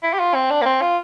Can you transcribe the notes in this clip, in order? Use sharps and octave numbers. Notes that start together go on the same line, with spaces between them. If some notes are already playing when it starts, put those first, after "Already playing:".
E4
G4
F4
C4
D4
A#3
C4
F4